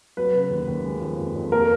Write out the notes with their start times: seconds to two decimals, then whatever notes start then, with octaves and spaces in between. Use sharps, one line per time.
0.17 F#3 B4
0.34 C#3
0.50 D#2
0.68 D#2
0.84 G#3
1.01 F3
1.18 F2
1.36 F2
1.52 A#3 A#4